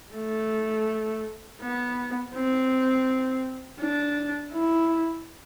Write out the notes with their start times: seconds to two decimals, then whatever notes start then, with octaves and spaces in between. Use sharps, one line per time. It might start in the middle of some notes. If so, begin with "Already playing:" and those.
0.15 A3
1.61 B3
2.34 C4
3.80 D4
4.52 E4